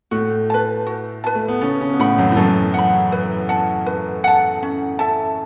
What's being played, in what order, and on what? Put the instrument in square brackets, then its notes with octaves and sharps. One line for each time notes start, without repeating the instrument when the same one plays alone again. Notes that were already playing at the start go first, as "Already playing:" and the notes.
[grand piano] A2 A3 [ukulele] F#4
[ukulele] B4 A5
F#4
B4 A5
[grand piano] A3
B3
[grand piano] C#3 C#4 [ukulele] A4
[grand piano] C#3 C#4
B3
[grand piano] A2 A3 [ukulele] F#5 B5
[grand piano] F#2 F#3
E3
[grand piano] F#2 F#3 [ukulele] A4
[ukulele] F#5 B5
B4
F#5 A5
B4
F#5 A5
C#4
A4 E5 A5